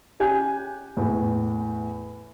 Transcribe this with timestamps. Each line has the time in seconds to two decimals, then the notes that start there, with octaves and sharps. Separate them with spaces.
0.20 C#4 G4 G#5 F#6 G6
0.97 E2 A2